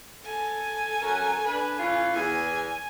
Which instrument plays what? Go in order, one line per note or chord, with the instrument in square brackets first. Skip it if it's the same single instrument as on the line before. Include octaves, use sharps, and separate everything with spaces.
[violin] A4 G#5
[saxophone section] F#3 C#4 A#4
D4 B4
E3 C#4 F4
[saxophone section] E2 [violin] G#5